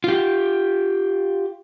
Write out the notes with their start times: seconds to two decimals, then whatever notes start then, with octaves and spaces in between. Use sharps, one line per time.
0.04 F4 G4